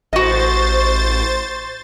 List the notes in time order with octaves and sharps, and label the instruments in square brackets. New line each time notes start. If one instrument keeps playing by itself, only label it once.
[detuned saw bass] A1 [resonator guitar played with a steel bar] F#4 D#5 [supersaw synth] C5 A6